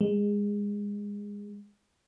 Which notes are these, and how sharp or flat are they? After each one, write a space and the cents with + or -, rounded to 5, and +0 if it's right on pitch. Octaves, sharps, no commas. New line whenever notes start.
G#3 -20